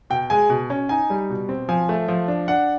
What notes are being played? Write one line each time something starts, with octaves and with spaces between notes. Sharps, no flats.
B2 G5
G#3 G#5
B2
C#4
D#4 G#5
G3
B2
C4
F3 G#5
A3
F3
D4
D4 F#5